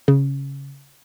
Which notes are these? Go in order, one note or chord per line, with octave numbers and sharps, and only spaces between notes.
C#3